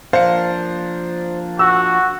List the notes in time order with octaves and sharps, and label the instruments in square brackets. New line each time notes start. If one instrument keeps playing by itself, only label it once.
[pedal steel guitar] F3 A#3 D4 [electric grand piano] C5 C#7 [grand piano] F5
[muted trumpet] F#4 [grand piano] E6